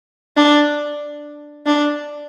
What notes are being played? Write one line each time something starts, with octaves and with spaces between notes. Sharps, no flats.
D4
D4